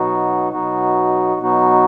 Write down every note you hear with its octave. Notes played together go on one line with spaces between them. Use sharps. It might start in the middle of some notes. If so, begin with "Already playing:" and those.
Already playing: B2 F#3 B3 D#4 F#4
B2 F#3 B3 D#4 F#4
B2 F#3 B3 D#4 F#4